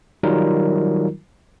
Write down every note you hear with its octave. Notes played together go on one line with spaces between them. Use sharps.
D#3 F#3 G3 D#4 F4 A#4